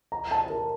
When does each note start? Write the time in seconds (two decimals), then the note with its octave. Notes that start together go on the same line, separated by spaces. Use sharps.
0.12 A#5
0.31 A5
0.50 A#4